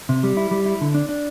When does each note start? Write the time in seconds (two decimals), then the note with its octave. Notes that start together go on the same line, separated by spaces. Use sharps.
0.09 C3
0.23 G3
0.37 E4
0.51 G3
0.66 E4
0.81 D3
0.94 D4
1.09 D4